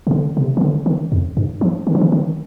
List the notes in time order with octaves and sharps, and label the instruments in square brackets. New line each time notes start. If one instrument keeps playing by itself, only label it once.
[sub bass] C3
D3
C3
D#3
D3
D#3
F2
G2
F3
D#3
F3
D#3
D#3